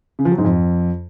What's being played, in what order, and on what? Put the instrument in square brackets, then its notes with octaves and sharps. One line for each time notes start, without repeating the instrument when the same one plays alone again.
[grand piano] C#3
F3
F#3
G#2
F2